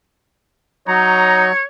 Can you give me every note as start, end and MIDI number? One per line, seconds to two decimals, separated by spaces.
0.88 1.52 54
0.88 1.47 63
0.88 1.66 73
0.88 1.46 82